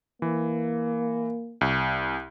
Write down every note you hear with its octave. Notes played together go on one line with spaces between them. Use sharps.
E3 A#3
C2